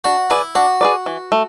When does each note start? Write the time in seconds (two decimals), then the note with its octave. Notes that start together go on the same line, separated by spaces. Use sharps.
0.04 D4 F#4
0.30 E4 G#4 B4 D5
0.55 D4 F#4
0.81 G#4 B4 D5
1.06 E3
1.32 A3